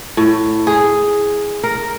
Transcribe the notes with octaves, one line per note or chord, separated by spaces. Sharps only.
A2
G#4
A#4